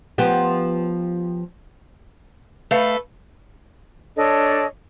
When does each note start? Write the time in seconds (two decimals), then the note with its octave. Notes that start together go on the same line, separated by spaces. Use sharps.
0.18 F3 B3 G4
2.71 A3 A4 B4 F5
4.16 D4 A4 C#5 D#5